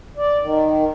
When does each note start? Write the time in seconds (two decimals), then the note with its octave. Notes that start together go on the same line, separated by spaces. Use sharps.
0.17 D5
0.41 D#3